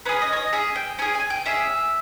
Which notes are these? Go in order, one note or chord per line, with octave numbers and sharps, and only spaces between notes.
C#4 G#4 B4
D#5
C#5
D#5
C#4 G#4 E5
G5
C#4 G#4 G#5
G#5
G5
C#4 G#4 E5